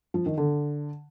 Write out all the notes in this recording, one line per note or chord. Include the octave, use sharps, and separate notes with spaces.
F3
D#3
D3